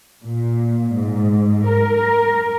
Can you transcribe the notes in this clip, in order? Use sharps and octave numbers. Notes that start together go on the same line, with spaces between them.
A#2
G#2
A#4